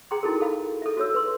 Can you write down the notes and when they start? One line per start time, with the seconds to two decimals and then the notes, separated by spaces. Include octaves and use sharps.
0.11 G#4 G5 A#5 C6
0.23 D#4 E4 F#4 A4 A#4
0.40 A4 F5 B5
0.82 A4 E5
0.97 F#4 A4 C#5 E6
1.14 B4 C6